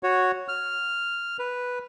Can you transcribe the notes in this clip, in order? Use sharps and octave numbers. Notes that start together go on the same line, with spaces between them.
F#4 C#5
F6
B4